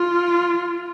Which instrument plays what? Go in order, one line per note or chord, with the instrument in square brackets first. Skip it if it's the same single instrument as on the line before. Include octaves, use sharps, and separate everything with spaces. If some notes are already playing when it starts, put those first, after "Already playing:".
Already playing: [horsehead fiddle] F4